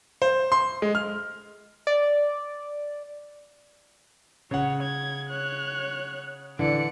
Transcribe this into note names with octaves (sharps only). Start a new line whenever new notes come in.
C5
C6
G#3
F6
D5
C#3 C#5 F#5
G#6
C#5 F#6
D3 E3 D5 C#7